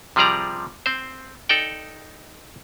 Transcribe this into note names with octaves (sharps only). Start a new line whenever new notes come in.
C3 F3 G3 G#4 D5 A#5
C4 C5
D#4 A4 D5 G5